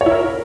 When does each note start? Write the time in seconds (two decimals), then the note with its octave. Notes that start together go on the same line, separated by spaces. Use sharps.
0.01 C#5
0.06 E4
0.11 A#4